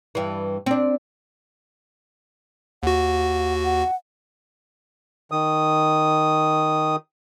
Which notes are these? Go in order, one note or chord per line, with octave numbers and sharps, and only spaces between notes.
G2 E3
C4 D4
D#2 F#4 F#5
F#5
D#3 D#6